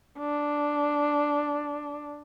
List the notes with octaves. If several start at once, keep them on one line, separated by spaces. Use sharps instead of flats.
D4